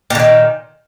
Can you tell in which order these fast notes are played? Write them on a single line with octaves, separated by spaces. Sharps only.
A#2 D3 D#3